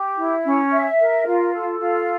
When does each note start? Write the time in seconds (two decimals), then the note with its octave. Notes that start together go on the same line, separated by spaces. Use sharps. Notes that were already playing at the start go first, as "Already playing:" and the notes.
Already playing: G4
0.18 E4
0.44 C#4
0.71 E5
0.99 A#4
1.25 F4
1.52 A4
1.79 F4